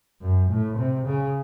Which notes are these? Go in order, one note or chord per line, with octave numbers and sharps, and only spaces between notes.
F#2
A2
C3
C#3